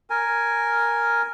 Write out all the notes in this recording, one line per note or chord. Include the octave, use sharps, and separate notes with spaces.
A#4 G#5